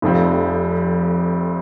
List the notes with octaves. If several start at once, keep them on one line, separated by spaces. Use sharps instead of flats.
F1 F2 C3 F3 C4